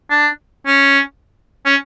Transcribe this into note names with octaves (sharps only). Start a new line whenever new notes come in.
D4
C#4
C#4